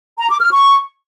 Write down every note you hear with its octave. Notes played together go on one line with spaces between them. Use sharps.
A#5
D6
F6
C#6